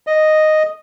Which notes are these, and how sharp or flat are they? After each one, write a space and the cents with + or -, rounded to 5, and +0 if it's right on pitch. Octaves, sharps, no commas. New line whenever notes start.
D#5 -5